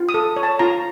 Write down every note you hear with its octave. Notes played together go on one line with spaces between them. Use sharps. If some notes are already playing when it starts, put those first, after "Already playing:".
Already playing: F4
D#6
A4
C#5
A5
F4 A#5